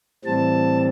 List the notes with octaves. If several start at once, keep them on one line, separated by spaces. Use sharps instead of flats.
A2 E3 G3 C4 A5